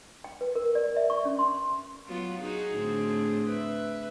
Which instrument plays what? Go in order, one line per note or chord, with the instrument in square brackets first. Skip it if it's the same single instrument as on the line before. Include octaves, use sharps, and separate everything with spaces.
[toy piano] G5
B4
A#4
D5
E5
C#6
C#4
C6
[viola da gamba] F#3 B3 F4
[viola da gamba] D#4 F#4 [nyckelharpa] G#4
[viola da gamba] A2 D3 C4
[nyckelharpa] B4 E5